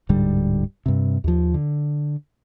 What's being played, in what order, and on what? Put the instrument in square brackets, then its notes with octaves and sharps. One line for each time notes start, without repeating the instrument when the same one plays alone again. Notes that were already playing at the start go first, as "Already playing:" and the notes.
[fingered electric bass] D1 G#2 D3 G3
G2 C3
D#2 F3
D3